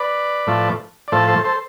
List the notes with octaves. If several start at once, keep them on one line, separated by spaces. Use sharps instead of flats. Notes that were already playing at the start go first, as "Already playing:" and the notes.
Already playing: B4 D5
A2 F3 A3
D5
A2 F3 A3 A4 C5
A4 C5
A4 C5